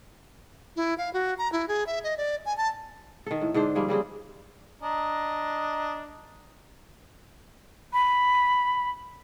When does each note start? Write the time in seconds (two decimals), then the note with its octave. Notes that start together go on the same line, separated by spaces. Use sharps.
0.76 E4
0.98 F5
1.13 F#4
1.38 A#5
1.52 E4
1.68 G#4
1.87 E5
2.04 D#5
2.18 D5
2.45 G#5
2.57 A5
3.26 D#3 A4
3.41 A2
3.54 G#2 D3 D4 C5
3.75 F3 G3 A#3 G#4
3.88 C#3 G3 C4 G#4
4.82 D4 D#5 A#5
7.93 B5